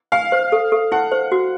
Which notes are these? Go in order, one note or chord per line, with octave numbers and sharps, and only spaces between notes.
F5 G#5
C5
A4
A4
E4 F#5
C5
F#4